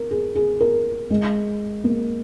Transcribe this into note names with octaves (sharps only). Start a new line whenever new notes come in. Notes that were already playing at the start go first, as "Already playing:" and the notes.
Already playing: A#4
G#4
G#4
A#4
G#3
A#3